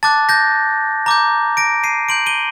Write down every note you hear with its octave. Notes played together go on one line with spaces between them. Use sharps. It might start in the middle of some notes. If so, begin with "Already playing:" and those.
A5 D6 F#6 A6
G6 A#6
A#5 D6 G6
A#6 D7
C7 D#7
C6 G6 D7 F#7
D#7 G7